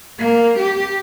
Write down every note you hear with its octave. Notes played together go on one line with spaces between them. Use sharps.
A#3
G4